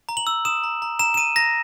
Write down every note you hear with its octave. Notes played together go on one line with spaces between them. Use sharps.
A#5
F#7
E6
D#6 E7
A#5
A#5
A#5 E7
E7
A#5 D#7
A#5 A#6